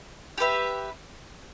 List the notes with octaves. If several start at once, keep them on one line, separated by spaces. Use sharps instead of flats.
G4 B4 E5